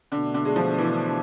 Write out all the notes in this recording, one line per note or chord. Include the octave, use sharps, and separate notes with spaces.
B2 D3 A3 D4
D3
G#3
F3
E3